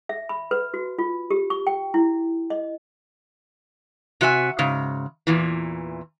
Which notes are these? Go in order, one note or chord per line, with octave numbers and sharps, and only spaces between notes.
E5
B5
B4
F#4
F4
G4
C#6
G5
E4
D#5
C3 F#4 E5 G#5
G#2 C#3
E2 A#2 E3